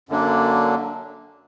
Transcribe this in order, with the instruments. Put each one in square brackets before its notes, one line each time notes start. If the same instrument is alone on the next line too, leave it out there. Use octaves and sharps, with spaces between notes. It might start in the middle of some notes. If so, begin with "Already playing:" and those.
[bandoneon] F#2 D3 F#3 A#3 D4